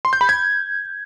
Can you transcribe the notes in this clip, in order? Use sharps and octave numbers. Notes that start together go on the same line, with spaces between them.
C6
G6
B5
G#6